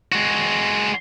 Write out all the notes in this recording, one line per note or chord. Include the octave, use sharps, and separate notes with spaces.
G#3 F#4